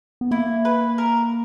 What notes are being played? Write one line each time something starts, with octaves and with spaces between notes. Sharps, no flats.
B3
A#3 E4
B4
A#4